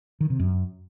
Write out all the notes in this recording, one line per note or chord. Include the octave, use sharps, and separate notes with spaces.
D#3
C3
F#2